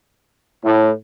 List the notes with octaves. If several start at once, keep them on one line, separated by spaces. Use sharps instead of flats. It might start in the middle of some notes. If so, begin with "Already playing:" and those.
A2